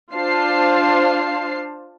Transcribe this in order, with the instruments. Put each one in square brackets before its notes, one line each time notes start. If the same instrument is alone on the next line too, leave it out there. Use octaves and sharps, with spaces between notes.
[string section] D4 F4 C5 F5 A5 C7